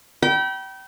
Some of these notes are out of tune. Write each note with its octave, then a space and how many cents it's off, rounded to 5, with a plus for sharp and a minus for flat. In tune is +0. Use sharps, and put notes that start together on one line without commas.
G5 -30 B5 -35